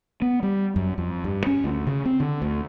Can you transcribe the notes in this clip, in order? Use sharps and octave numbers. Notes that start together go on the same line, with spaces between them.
B3
G3
F#2
F2
G2
C#4
D2
C#3
C4
D3
D2